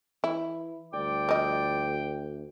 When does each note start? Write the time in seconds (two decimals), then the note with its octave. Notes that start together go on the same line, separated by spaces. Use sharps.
0.24 E3 E4
0.93 D2 G3 D5 G5 D6
1.29 F3 D#5